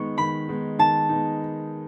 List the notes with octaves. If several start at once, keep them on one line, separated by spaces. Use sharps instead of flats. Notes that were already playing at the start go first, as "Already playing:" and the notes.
Already playing: D#3 G#3 B3 D#4 C#6
D#3 B5
G#3 B3 D#4
D#3 A5
G#3 B3 D#4